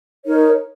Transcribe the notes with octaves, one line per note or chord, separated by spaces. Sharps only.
D#4 A#4 C#5